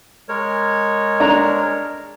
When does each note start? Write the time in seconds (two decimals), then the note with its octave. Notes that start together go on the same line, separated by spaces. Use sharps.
0.29 G#3 A#4 C#5
1.20 D4 A#5